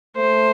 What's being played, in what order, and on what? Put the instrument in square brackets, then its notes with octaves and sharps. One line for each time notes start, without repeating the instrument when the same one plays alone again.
[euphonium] A3 [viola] C5